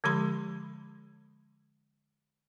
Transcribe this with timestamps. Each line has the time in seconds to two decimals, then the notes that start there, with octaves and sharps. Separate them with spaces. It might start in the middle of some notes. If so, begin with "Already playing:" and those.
0.04 D3 F3 G#3 G4 B5 C6